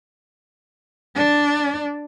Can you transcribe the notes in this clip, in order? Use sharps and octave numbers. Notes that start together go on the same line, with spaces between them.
D4 D5